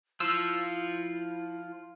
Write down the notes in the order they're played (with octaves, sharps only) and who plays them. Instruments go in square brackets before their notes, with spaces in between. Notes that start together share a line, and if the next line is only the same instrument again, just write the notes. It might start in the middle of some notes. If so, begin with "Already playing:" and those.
[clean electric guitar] F3 F4 [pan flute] E4 [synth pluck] E6